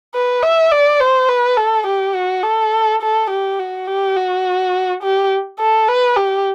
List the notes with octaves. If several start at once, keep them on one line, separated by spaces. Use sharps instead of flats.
B4
E5
D5
C5
B4
A4
G4
F#4
A4
A4
G4
F#4
G4
F#4
G4
A4
B4
G4